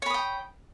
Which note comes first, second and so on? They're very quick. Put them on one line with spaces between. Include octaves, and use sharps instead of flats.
C#5 B5 D#6 G5